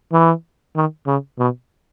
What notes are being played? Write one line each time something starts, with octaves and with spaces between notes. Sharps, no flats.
E3
D#3
C#3
B2